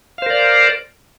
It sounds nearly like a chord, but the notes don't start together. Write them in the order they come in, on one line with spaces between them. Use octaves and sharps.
F5 C5 A#4 D5